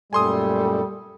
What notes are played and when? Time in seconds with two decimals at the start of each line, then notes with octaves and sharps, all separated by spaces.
0.13 F#2 A#2 G3 A3 A4 G#5 C6 D#6